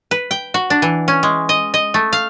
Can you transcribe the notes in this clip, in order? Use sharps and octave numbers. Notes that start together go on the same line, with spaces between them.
B4
G5
F#4
D4
E3
C#4
G#3
D#5
D#5
A3
F5